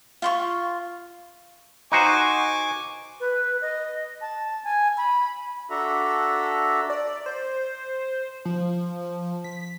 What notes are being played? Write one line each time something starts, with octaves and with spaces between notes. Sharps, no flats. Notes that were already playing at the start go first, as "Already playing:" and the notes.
F4 C6 C#6
D#4 F#4 C5 G#5 C#6 D6
B4
D#5
A5
G#5
B5
D4 F#4 A4 E5 A#5
D5
C5
F3
B6